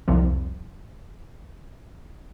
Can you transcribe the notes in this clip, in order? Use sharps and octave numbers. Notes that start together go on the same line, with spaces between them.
C2 F2 F3